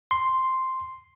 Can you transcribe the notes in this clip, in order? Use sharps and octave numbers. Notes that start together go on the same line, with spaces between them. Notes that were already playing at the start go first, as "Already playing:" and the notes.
C6